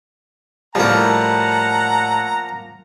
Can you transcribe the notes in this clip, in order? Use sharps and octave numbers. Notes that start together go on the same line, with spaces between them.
A2 F3 G3 A#3 F#5 A5 A#5